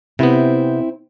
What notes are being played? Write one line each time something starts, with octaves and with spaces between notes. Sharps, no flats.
C3 B3 C4 E4 C5